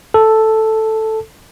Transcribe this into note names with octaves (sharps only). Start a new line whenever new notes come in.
A4